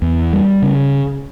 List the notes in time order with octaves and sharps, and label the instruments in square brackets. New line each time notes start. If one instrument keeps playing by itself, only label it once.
[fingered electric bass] E2
G3
C#3